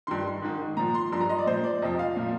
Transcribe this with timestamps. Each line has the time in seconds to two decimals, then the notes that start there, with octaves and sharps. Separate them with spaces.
0.07 G2 D#3 C6
0.42 G#2 D#3
0.77 A#2 F3 A#5
0.94 C6
1.12 G2 F3 C6
1.21 A#5
1.29 D#5
1.39 D5
1.47 A#2 F3 C5
1.64 D5
1.82 F2 C3 F3 D#5
1.99 F5
2.17 A#2 F3